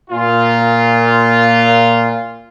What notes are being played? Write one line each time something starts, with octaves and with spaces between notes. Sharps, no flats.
A#2 F4